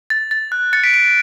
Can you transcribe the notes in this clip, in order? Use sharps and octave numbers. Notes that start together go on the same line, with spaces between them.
A6
A6
F#6
A6 C#7
B6 D7
B6 D7